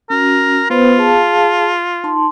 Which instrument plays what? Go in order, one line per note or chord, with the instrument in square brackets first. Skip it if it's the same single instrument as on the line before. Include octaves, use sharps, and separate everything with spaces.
[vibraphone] C#4 F#4 [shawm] A#4
[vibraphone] B3 B4 C5 [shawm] F4
[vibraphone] G#4 F5 A5
D#4 A5 C6